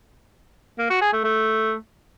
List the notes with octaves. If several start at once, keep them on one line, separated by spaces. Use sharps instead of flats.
A#3
F#4
G#4
A3
A3